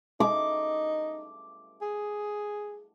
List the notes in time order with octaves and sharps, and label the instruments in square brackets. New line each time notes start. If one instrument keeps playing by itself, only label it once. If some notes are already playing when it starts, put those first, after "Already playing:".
[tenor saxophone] D#4 [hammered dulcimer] D6
[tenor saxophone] G#4